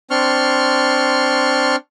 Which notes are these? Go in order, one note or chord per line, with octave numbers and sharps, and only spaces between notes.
C4 D4 C6 C#6 F6